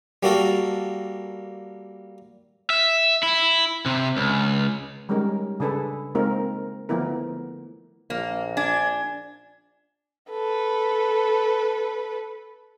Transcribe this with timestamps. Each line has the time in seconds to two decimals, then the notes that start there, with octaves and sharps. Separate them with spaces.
0.23 G3 A#3 F#4 A4 A#4
2.70 E5
3.23 E4
3.86 C3
4.17 C#2
5.09 G3 G#3 C#4 D#4 A#4 C#5
5.60 C#3 D4 G#4 A4 B4
6.15 G#3 A#3 C4 D#4 F4 A#4
6.89 D3 F3 A3 B3 E4 A#4
8.10 A#1 A#3
8.57 D4 G#5 G#6
10.30 A4 B4